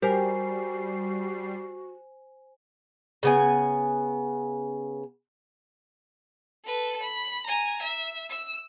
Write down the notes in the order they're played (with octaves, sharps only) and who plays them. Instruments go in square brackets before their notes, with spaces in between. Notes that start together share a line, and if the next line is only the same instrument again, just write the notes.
[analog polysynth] G3 C7 [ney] F#4 [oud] G4 A#4 [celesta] C5 G#5
[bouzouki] C#3 B3 G#5
[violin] A4 B4
B5
G#5 A#5
E5
E6